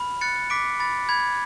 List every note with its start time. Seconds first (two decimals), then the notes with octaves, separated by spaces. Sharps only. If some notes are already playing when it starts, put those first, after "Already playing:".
Already playing: B5 F6
0.21 F#6 A6 C#7
0.50 D6 B6 D7
0.80 B5 A6
1.09 B5 G#6